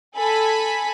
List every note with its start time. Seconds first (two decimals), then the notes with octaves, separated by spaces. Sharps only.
0.17 A4 G#5 B5